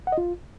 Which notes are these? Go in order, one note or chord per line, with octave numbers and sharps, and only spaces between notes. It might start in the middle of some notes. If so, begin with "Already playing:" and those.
F#5
D#5
F4